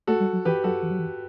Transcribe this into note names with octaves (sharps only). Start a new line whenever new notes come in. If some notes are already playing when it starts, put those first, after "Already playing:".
A3 F#4 A4
G3
F#3
E3 G4 B4
F#3 F#4 A4
E3
F#3
E3